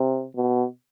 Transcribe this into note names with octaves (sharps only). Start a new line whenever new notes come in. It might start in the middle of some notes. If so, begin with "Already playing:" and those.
Already playing: C3
B2